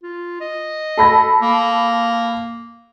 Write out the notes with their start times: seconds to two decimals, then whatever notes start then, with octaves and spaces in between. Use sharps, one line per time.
0.03 F4
0.41 D#5
0.97 A4 B5 A#6
1.41 A#3